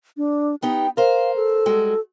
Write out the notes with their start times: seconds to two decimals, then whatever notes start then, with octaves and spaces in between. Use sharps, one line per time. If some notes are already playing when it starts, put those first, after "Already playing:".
0.17 D4
0.62 B3 D#4 G4 G5
0.97 A#4 C5 F5
1.36 A4
1.66 G3 G#3 F#4